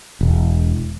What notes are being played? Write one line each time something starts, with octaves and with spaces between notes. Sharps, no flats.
E1